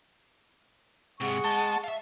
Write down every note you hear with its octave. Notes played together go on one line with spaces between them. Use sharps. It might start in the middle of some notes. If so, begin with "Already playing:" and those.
G#2 C3 G#4 F#5 C#6
G#3 A5
E5 F5